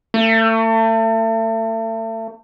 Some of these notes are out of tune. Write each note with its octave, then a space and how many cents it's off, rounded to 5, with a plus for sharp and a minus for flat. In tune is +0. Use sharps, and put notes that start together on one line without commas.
A3 +35